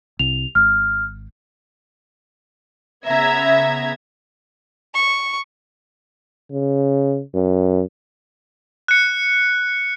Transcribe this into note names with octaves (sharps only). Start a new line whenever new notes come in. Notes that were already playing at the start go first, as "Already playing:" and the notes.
C2 F7
G#1 F6
C#3 B3 E5 A#5 G#6
C#6
C#3
F#2
F#6 C#7